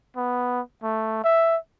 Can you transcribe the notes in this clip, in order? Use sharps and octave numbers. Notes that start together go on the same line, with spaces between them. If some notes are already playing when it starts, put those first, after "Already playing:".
B3
A3
E5